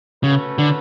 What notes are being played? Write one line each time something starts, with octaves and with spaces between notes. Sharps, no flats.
C#3 A3 C#4 F#4 B4
D3